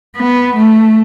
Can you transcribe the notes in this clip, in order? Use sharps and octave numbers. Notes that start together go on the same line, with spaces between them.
B3
A3